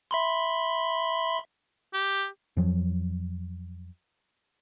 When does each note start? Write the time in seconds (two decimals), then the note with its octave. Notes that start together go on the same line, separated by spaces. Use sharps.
0.11 E5 B5 C6
1.94 G4
2.57 F2 F3 F#3